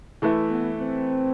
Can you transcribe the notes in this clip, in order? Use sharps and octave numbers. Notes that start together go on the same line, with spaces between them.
E3 A3 E4 B4 E5
B3
C4